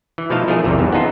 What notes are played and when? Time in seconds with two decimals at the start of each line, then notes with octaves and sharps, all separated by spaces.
0.18 E3
0.30 B2 F3 A3 D#4 F5 A5
0.48 F3 A3 G#4 A#4
0.64 A#1 E2 C3 D#3 E3
0.79 E2 G2
0.92 B3 C#4 D#4 F4 A4